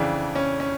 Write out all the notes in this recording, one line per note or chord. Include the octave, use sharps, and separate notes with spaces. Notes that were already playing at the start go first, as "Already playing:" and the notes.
Already playing: F2 C#3 E3 D4
C#4
C#4